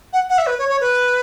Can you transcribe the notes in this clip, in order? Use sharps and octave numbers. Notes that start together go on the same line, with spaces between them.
F#5
F#5
E5
B4
C#5
C#5
B4